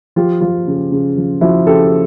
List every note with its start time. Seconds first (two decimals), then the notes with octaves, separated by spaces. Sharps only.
0.16 F3 F4 G4
0.41 F3 F4
0.67 C#3
0.92 C#3
1.17 F3
1.41 F3 E4 F#4
1.66 C#3 G4 A4